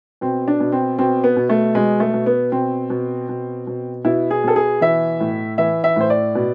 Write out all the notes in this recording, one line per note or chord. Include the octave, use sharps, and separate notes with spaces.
B2 C4
D4
B2
C4
B2 C4
B3
B2
A3
B2 G#3
A3
B2
B3
B2 C4
B2
B2
B2
B2 E4
G#4
B2 A4
G#4
E3 E5
A2
E3 E5
E5
A2 C5
D5
B2